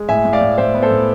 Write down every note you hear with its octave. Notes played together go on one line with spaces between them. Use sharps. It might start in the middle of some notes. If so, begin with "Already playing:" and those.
Already playing: G#3
A2 E5 G#5
A2
D5 F5
A2
A2 C5 E5
B3
A4 C5
A2